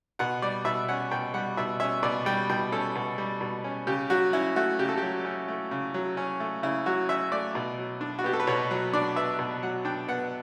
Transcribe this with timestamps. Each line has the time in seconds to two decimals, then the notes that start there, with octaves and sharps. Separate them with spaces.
0.19 B2 F#5
0.42 G3 D5
0.65 B2 E5
0.89 C#4 F#5
1.11 B2 G5
1.34 G3 F#5
1.57 B2 E5
1.80 C#4 E5
2.03 B2 D5
2.26 G3 G5
2.50 B2 G5
2.72 C#4 A4
2.95 B2
3.18 G3
3.41 B2
3.64 C#4
3.87 C#3 G4
4.10 F#3 F#4
4.33 C#4 E4
4.56 A3 F#4
4.79 C#3 G4
4.89 A4
4.98 G4
5.03 F#3
5.25 C#4
5.48 A3
5.71 C#3
5.94 F#3
6.17 C#4
6.40 A3
6.63 C#3 E4
6.86 F#3 F#4
7.09 C#4 E5
7.32 A3 D5
7.55 B2
7.78 F#3
8.01 D4
8.19 F#4
8.24 B3 G4
8.33 A4
8.40 B4
8.47 B2 C#5
8.71 F#3
8.93 D4 D5
9.16 B3 E5
9.39 B2
9.63 F#3 F#5
9.85 D4 G5
10.08 B3 F#5